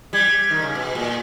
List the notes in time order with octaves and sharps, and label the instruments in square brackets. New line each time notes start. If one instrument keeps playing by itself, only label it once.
[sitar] G3 [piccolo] G#6
[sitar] D#3
C#3
B2
A#2